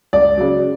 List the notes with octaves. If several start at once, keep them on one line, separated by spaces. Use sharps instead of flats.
C#2 D5
C#3 F#3